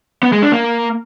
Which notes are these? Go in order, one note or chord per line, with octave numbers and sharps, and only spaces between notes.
B3
G#3
D4
A#3